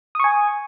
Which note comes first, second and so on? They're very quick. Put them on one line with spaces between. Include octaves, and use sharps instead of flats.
D#6 C#6 G#5